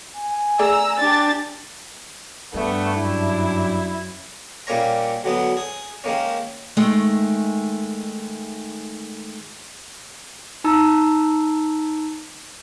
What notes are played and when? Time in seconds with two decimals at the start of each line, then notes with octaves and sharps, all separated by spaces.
0.15 G#5
0.59 A3 G#4 D5 A#5 E6
1.00 D4 G4 A6
2.54 G2 A3 B3 D4 G4
2.99 F#2 E4
4.67 A#2 G3 A#3 C#4 C#5 A#5
5.24 D2 F#3 G#3 B3
5.57 G#4
6.04 D#3 G#3 A#3 C#4
6.77 D#3 G#3 A3
10.64 D#4 A5 A#5 E6